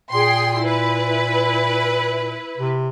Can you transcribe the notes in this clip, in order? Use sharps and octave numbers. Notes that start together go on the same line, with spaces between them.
A#2 G#4 G5 C6
E4 B4
C3